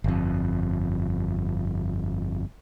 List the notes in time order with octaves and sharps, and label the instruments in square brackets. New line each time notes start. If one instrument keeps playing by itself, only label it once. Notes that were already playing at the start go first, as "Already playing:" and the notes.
[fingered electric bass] G1 F2